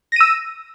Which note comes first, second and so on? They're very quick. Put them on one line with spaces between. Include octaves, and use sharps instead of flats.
A#6 D#7 E6